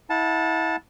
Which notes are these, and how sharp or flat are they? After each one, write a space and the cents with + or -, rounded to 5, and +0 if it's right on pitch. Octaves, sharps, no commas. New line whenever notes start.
E4 -25 F#5 -40 A5 +0